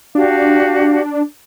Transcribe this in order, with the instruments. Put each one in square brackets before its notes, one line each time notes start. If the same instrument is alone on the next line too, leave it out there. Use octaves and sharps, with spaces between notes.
[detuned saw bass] D4 [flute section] F#4 G4 F5